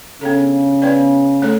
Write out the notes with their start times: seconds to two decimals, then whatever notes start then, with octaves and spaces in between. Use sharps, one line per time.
0.21 C#3 B3 D4 A4
0.82 B3 E4 B4 D5
1.42 A3 D4 A4 C#5